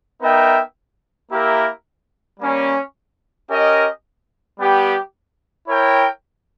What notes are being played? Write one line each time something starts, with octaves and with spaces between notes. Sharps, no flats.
B3 D#4 A#4 E5 G5
A#3 E4 G4 A#4 E5
G3 A#3 C#4
C#4 G4 A#4 D#5
G3 B3 G4
E4 A#4 C#5 G5